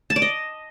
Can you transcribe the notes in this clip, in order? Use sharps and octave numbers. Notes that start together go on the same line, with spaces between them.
A5
D5
D#5